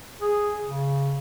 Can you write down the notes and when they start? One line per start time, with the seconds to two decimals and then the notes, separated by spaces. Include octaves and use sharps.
0.22 G#4
0.64 C#3